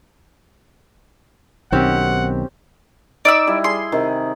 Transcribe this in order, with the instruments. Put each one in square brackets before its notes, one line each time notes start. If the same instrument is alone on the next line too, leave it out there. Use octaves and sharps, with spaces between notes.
[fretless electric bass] B1 D#3 [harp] C4 C#4 G4 [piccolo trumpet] F#5
[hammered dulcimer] D#4 [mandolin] D5 E5 E6
[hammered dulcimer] G3 E4
[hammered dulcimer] G#4 [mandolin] C6
[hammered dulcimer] C3 D#3